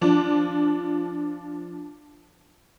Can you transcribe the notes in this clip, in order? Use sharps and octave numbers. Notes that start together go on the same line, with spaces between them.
F3 D4